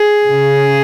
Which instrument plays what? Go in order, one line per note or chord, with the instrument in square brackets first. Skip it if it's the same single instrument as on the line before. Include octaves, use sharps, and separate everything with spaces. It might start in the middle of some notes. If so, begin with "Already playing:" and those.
Already playing: [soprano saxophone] G#4
[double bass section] C#3